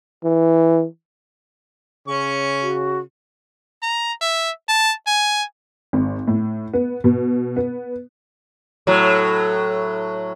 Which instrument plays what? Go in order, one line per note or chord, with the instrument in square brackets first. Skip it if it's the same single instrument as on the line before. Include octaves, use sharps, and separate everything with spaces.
[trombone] E3
[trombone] C#3 [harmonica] C#4 C#6
[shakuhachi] F#4
[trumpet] A#5
E5
A5
G#5
[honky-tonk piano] G#1
A2
B3
B2
B3
[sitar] A2 F#3